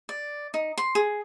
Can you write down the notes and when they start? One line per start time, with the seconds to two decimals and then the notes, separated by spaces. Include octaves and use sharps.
0.09 D5
0.54 D#4
0.78 C6
0.95 G#4